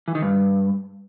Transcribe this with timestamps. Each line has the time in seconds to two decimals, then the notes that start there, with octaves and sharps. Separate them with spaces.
0.08 E3
0.15 D#3
0.22 G2